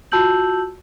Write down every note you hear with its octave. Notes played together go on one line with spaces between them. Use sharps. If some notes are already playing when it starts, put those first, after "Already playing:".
F4 F#4 A5 E6 G6 F#7